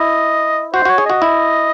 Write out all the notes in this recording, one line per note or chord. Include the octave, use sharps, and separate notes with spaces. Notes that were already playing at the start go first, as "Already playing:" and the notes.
Already playing: E4 D#5
F#4 C5
F#4 C#5
G#4
F#4 D#5
E4